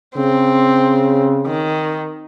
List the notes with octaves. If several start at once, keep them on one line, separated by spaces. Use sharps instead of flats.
C#3 C4
D#3